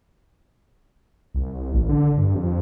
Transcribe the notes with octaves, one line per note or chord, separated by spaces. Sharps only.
C2
A1
D3
G2
F2